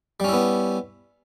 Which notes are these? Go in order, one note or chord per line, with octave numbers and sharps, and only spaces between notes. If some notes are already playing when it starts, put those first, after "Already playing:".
G3 B3 C#4 E4